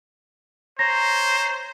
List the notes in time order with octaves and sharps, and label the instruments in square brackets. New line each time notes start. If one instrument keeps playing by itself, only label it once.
[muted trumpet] C5 [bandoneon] C#5 A#5 [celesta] A#6